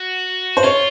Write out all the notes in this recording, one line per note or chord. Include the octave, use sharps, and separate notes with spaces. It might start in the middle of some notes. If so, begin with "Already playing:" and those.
Already playing: F#4
C5
F4 C#5